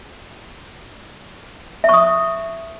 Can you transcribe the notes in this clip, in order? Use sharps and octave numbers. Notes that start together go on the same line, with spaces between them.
E5 C#6 D#6